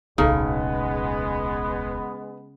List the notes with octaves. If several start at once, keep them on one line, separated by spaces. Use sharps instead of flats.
D1 B1 C#3 G#3 B3 D#4 A4